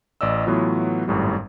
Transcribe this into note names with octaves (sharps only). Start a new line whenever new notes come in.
A1 D5 D#5 E6
A2 E3 F#3 B3 F4
G#1 F#2 A2 G3